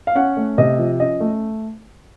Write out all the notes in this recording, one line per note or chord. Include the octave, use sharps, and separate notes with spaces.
F5
C#4 F#5
A3
C3 D#5
F3
C#4 D#5
A3